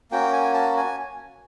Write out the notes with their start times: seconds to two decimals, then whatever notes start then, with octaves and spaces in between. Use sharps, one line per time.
0.11 A#3 C#4 F#4 G5
0.33 G#5
0.54 A5
0.77 G#5